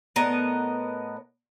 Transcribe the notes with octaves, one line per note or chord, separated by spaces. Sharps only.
A2 B3 A#4 D#5